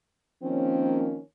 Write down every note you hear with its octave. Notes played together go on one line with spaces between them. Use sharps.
D#3 F3 A#3 C4 C#4